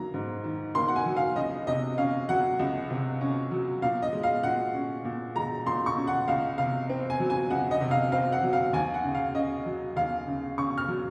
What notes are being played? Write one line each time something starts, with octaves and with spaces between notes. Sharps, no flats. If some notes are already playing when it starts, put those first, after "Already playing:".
Already playing: D#3 F#3 A#3 A#5
G#2
D#3
A#3 C6
F#5
G#5
F#3
F5
C#2 D#5
C3 D#5
C#4 F5
F#3 F#5
C#2
C3
C#4
F#3
A#2 F5
D#5
G#3
F5
A#2 F#5
C#4
A#2
G#3 A#5
A#2 C6
C#6
C#4
F#5
C#2 F5
C3 F5
C4
G#5
F#3
G#5
C#2 F#5
D#5
C3
F5
C4 F5
F#5
F#3
F5
D#2 G#5
F#5
C#3
F5
C#4 D#5
F#3
D#2 F5
C#3
C#4 C#6
F6
F#3